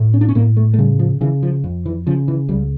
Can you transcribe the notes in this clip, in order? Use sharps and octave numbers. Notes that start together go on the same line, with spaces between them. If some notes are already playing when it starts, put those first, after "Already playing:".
Already playing: A2
C#4
D4
C#4
A2 A#3
A3
A3
C#3 G3
F3
C#3 E3
F3
F2
E3
C#3 F3
E3
C#2 G3